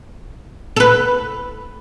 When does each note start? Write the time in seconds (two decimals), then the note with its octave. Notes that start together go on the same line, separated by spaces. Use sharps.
0.76 A4
0.80 B4